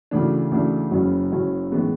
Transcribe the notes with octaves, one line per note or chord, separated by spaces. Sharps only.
D2 C#3 E3 A3 D4
D2 C#3 E3 A3 D4
F#1 F#2 C#3 F#3 C#4
F#1 F#2 C#3 F#3 C#4
A2 E3 G#3 B3